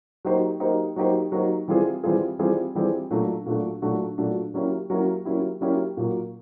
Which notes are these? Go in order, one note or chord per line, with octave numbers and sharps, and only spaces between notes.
F#3 A#3 D#4 G4 C5
F#3 A#3 D#4 G4 C5
F#3 A#3 D#4 G4 C5
F#3 A#3 D#4 G4 C5
E3 G3 C4 F4 G#4
E3 G3 C4 F4 G#4
E3 G3 C4 F4 G#4
E3 G3 C4 F4 G#4
A#2 F#3 A3 D4 F#4
A#2 F#3 A3 D4 F#4
A#2 F#3 A3 D4 F#4
A#2 F#3 A3 D4 F#4
F#3 A#3 C#4 E4 G4
F#3 A#3 C#4 E4 G4
F#3 A#3 C#4 E4 G4
F#3 A#3 C#4 E4 G4
A#2 F#3 A#3